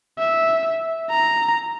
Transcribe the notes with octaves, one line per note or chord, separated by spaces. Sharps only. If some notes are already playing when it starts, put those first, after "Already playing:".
E5
A#5